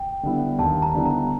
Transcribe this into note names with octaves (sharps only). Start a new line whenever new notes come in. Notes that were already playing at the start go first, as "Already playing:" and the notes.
Already playing: G5
D3 G3 B3 E4
D#2 A5
A#5
D3 G3 B3 E4
A#5